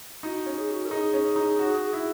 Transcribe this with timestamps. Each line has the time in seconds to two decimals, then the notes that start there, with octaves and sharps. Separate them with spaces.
0.23 D#4 F#4
0.46 C#4
0.57 G#4
0.71 F#4
0.85 A#4
0.89 D#4 G#4
1.14 C#4
1.36 D#4
1.59 F#4
1.93 E4